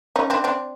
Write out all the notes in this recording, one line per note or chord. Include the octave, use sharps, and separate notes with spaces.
C#4 D#4
C4 D4
C4 D4